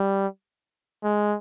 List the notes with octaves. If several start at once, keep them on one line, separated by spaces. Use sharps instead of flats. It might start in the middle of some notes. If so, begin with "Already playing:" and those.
Already playing: G3
G#3